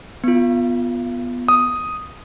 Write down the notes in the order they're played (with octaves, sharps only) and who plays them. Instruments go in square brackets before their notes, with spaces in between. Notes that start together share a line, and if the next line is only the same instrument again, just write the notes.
[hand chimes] B3 F4
[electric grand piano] D#6